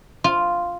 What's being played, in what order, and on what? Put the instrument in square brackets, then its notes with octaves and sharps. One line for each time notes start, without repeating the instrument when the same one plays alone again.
[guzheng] F4